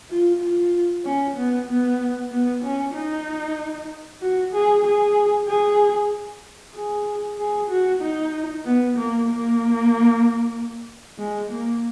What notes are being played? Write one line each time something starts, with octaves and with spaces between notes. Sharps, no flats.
F4
F4
C#4
B3
B3
B3
C#4
D#4
F#4
G#4
G#4
G#4
G#4
G#4
F#4
D#4
B3
A#3
A#3
G#3
A#3